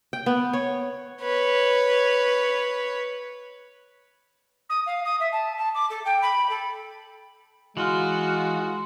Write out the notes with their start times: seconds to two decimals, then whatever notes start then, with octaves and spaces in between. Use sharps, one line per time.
0.13 G5
0.26 B3
0.53 C#5
1.22 B4 C#5
4.69 D#6
4.86 F5
5.05 D#6
5.20 E5
5.32 A5
5.57 A5
5.74 D6
5.90 A4
6.05 G5
6.22 B5
6.49 A4
7.77 E3 G#3 F4 F#4